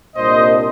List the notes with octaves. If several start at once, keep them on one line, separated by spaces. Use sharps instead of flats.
C2 A#2 G3 D4 C5 D#5